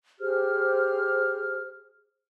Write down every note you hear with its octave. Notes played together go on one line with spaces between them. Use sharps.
G4 G#4 C5 F6